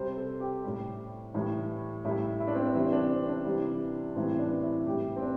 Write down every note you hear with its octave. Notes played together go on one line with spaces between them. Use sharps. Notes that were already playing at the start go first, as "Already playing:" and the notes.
Already playing: C3 G3 C5
A4
G4
A2 G3
A2 E3 G3
A2 G3 E4
E4
D4
C4
D4
C3 E3 G3 C4
D4
C4
D4
C3 E3 G3
A2 E3 G3 C4
D4
E4
A2 G3 G4
C4
D4